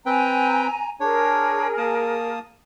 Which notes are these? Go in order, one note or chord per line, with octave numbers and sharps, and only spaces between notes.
C4 B4 G5 G#5 A#5
D4 G#4 A#4 C#5
A#3 A5 D#6